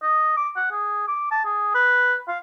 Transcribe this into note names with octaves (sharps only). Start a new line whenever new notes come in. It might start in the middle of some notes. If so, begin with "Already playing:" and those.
D#5
D6
F#5
G#4
D6
A5
G#4
B4
F5